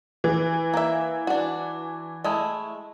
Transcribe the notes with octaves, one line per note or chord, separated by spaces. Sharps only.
E3
A#3 E5
D4 F#4
G#3 A3 E4